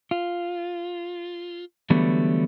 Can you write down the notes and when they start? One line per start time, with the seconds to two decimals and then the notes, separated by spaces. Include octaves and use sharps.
0.11 F4
1.90 D3 E3 F#3 G3 A3 B3